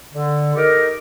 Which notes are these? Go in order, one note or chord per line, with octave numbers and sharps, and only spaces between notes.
D3
D#4 G4 A4 A#4